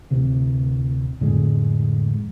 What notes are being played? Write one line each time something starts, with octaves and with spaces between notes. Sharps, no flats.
D1 C3
F2 A2 D3 G#3